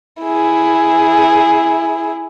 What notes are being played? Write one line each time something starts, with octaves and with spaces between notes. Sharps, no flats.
E4 G#4